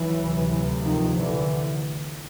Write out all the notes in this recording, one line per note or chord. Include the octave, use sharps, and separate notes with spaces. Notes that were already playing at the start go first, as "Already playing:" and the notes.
Already playing: E3 F#3
D2 C3
D#3 F3
D3 E3